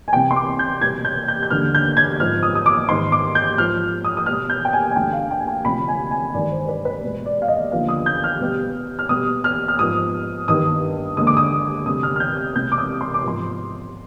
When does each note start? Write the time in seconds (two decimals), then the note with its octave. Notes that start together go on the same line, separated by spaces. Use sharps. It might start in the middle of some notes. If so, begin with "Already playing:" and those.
0.08 G#5
0.13 C2 C3 G3 B3 G5
0.31 C6
0.36 D6
0.59 G6
0.81 B2 G3 B3 G#6
1.05 G6
1.28 G6
1.43 G6
1.50 D#2 D3 G3 B3 F6
1.75 G6
1.97 G#6
2.20 G#2 F3 B3 F6
2.43 D#6
2.55 D#6
2.66 D6
2.89 G#2 D#3 G#3 B3 C6
3.12 D6
3.35 G6
3.58 G#2 F3 B3 F6
4.05 D#6
4.17 D#6
4.26 B2 G3 B3 F6
4.50 G6
4.65 G5
4.73 G#5
4.91 G#5
4.96 D2 D3 G3 G5
5.13 F5
5.31 G5
5.40 G#5
5.48 G5
5.65 D2 C3 F3 B5
5.88 G#5
6.11 G#5
6.34 G2 D#3 G#3 D5
6.52 C5
6.69 B4
6.85 B4
7.03 B2 G#3 B3
7.26 D5
7.42 F5
7.48 D#5
7.72 D#2 D3 F3 B3 F5
7.89 D#6
8.06 G6
8.24 F6
8.41 B2 G3 B3
8.99 F6
9.09 B2 G3 B3 D#6
9.44 F6
9.68 F6
9.79 G#2 F3 B3 D#6
10.48 G2 D#3 B3 D#6
11.17 D#2 D3 G#3 D#6
11.27 D6
11.37 D#6
11.86 D2 C3 G3 B3 D#6
12.03 F6
12.16 F6
12.20 G6
12.55 C2 B2 G#3 B3 G6
12.72 D6
12.78 D#6
13.01 C6
13.14 D6
13.24 G#2 F3 B3 C6